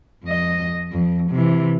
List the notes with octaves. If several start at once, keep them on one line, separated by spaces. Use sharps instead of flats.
F2 D#5
F2
C3 E3